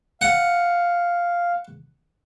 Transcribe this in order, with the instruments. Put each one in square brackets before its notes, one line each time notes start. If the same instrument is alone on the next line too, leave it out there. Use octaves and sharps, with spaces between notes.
[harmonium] F5 [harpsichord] F#5